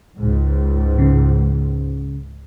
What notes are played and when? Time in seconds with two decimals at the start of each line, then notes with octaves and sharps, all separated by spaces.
0.19 C#2 G#2
0.99 C#3